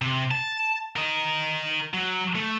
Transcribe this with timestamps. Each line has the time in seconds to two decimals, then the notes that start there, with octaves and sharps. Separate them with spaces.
0.02 C3
0.31 A5
0.96 A#4 D#5
1.94 F#3
2.35 A3